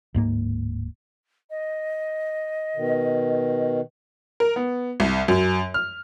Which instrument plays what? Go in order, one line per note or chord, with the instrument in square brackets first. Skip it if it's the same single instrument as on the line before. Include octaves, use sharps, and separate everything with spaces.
[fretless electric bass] D1 G#2 A#3
[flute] D#5
[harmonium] B2 D#3
[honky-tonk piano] A#4
B3
C2
F#2
F6